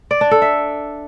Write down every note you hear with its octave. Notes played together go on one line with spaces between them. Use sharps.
D5
D4
A4
E5